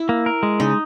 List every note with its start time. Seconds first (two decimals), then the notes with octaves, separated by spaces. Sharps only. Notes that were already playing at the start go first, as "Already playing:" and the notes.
Already playing: E4
0.09 A#3
0.26 A#4
0.43 G#3
0.60 C#3 D#4